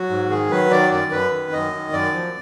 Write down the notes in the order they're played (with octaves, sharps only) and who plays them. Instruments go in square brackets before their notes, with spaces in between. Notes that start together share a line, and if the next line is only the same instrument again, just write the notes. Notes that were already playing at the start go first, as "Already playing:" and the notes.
Already playing: [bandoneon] F#3 F#4
G#2
D#3 G#4
F#3 B4
D#3 D5
F#2 D5
F#2 B4
D#3
F#2 D#5
D#3
F#2 D5
F3